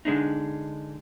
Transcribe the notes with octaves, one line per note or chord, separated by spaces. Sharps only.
D3 G#3 D4 D#4